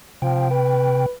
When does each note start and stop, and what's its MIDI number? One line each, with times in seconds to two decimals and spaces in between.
0.22 1.06 48
0.22 0.47 53
0.22 1.06 79
0.51 1.13 71